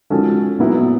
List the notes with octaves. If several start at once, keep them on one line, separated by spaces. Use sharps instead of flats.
F3 G#3 C#4 F#4 A4
A#2 F#3 B3 E4